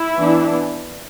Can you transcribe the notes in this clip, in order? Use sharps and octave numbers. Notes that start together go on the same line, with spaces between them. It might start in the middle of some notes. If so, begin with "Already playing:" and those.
Already playing: E4
E3 B3 D4